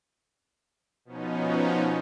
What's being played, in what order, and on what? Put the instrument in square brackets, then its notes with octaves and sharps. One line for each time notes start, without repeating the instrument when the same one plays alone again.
[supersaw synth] B2 F3 B3 C#4 D#4